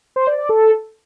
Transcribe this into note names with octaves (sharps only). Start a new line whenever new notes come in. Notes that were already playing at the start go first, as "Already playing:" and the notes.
C5
D5
D5
A4